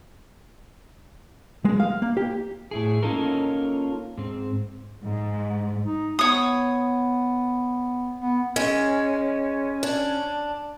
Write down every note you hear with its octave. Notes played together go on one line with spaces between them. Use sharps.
G#3
F5
A#3
G4
A2 E4 G#4
A#3 C#4 D#4 F4 A4 A#4
G#2 C4
G#2
D#4
B3 C#5 D#6
B3
G#3 C#4
D4